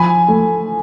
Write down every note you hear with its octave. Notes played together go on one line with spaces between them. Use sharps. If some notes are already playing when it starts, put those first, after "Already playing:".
Already playing: F3 G#5 B5
A3